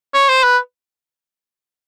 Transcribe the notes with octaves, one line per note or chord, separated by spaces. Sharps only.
C#5
C5
B4